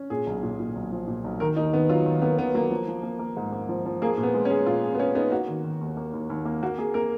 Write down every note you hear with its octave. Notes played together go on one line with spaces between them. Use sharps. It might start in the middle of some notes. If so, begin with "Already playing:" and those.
Already playing: C#4
A#2 G#4
B1
A#2
A#2
B1
F3
A#2
B1
D#3 A#4
D#2 D#4
D#3 B3
F#3 F4
D#3
A#3 B3
D#3 B3
F#3 A#3
F3
F3
A#3
A#3
G#2
A#3
F3
F3
A#3 G#4
A#2
B3
G#3
C#4
G#4
A#2 F4
G#4
B3
C#4 G#4
B3 D#4
A#3 F#4
D#3
D#3
D#2
A#3
D#2
D#2
A#3
A#3 F#4
A#3 G#4
A#3 A#4